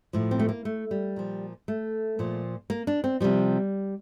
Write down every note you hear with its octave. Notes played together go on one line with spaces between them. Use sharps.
A2 F3
C4
A3
A#3
A3
G3
A#2 F3
A3
A#2 F3
A#3
D4
C4
C3 F3 G3